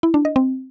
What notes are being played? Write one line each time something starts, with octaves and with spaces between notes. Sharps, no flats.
E4
D4
D#5
C4